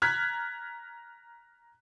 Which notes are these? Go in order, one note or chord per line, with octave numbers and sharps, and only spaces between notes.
A#5 F6 F#6 G#6 B6